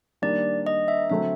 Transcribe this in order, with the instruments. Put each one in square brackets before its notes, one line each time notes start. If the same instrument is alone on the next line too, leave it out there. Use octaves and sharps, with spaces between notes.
[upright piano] D#3 G3 A#3 D4 [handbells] D5
[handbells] D#5
E5
[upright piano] D3 F#3 A3 C4 [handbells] E5